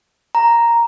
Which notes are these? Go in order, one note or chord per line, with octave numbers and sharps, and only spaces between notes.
A#5